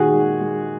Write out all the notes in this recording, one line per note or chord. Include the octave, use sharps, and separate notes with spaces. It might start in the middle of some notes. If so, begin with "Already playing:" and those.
Already playing: A#2 D#3 F#4 G#4
G#3
G#3